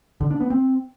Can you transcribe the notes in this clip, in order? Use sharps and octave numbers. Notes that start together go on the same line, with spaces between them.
D3
D4
B3
C4